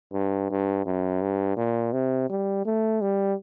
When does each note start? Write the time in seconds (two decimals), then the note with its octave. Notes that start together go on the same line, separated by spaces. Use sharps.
0.13 G2
0.50 G2
0.86 F#2
1.22 G2
1.57 A#2
1.93 C3
2.30 G3
2.66 A3
3.01 G3